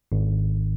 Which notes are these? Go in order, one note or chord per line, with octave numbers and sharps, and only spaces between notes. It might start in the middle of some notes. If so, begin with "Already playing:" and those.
G#1